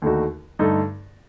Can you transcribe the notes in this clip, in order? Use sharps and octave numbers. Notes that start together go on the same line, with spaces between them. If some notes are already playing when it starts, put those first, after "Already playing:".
D#2 D3 A3 D#4 F#4
G2 D3 A3 D#4 A4